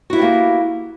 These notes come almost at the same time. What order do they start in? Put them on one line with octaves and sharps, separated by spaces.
F#4 E4 B3 G4 A#3